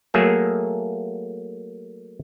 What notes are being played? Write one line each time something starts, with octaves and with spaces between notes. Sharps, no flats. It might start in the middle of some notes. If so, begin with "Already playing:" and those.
F#3 A3 A#3 G#4 E5